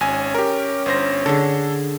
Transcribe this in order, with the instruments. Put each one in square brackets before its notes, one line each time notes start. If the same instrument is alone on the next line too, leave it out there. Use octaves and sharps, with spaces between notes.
[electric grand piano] G#1 G#5 [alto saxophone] C#4
[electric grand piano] G4 A#4
G1 C5 A#6
[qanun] D3 G#4 [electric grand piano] A4